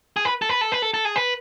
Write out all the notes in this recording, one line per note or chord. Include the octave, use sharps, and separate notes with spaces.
G#4
B4
A4
B4
A4
B4
A4
A4
G#4
B4